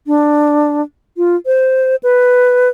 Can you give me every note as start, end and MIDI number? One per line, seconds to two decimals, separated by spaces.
0.07 0.82 62
1.17 1.36 65
1.46 1.96 72
2.03 2.69 71